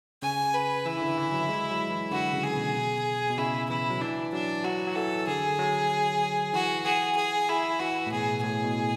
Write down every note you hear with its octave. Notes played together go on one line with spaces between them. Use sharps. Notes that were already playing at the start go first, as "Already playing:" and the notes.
C#3 G#5
B4
E3 E4
E3
D3
E3
F#3
G#3
F#3
E3
D3 F#4
C#3
G#4
B2
B2
C#3 E4
E3 E4
F#3
E3 D4
F#3 D4
F#3 F#4
F#3
E3 A4
D3 G#4
F#3
E3 F#4
G#4
G#4
E4
E3 F#4
A2
B2 G#4
A2 G#4
B2